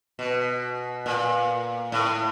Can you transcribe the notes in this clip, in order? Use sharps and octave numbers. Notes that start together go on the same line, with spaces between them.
B2
A#2
A2